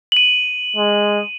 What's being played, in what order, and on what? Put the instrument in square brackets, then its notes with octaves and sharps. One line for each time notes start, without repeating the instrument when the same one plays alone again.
[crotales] D#7 F#7
[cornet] G#3